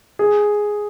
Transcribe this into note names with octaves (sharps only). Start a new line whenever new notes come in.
G#4